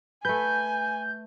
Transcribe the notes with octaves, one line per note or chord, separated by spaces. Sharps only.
A3 B4 G#5 G6